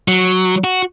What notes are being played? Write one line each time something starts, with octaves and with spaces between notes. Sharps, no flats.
F#3
F#4